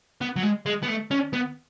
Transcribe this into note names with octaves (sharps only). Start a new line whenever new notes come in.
B3
F#3
G#3
G#3
B3
A3
C#4
B3